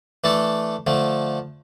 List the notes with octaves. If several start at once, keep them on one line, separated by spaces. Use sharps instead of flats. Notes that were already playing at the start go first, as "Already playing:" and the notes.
E3 A3 D4 A4
D3 F3 A3